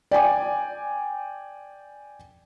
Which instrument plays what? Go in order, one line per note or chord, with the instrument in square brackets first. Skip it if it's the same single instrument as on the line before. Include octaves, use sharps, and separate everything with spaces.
[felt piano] D5 G5 G#5 D6